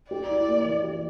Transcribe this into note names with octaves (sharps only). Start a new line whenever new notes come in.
G4 D5
E4
A#3
E3
G4